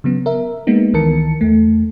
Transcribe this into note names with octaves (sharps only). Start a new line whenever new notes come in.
C#3 F#3 B3
A#4 E5
G#3 A#3 B3 D#4
C#2 D#3 E3 A#4 A5 C#7
E2 A3